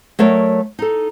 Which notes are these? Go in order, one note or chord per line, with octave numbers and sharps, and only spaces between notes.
F#3 A3 A#4 C#5 D5
D#4 A4